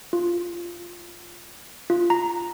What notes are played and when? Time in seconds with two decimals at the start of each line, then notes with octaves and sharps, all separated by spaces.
0.13 F4
1.90 F4
2.10 A#5